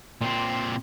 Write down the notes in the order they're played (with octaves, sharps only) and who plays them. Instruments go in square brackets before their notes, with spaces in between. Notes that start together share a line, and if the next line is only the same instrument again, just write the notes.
[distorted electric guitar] A#2 C4